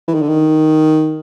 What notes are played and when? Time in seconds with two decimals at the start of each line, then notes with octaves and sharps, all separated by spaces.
0.08 E3
0.15 D#3
0.21 D3
0.29 D#3